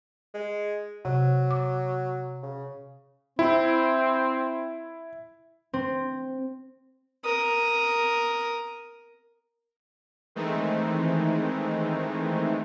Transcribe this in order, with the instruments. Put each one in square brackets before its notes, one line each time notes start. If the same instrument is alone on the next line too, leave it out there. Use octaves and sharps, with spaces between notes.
[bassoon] G#3
[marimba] C3 [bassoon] F#3
[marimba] D6
[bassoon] C#3
[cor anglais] C4 [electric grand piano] E4
[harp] C4
[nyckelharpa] A#4 D#6
[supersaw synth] D#3 E3 G#3 A3 C4 D#4